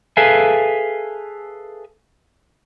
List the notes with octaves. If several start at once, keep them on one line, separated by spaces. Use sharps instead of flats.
G#4 A4 B4 E5 F5 G#5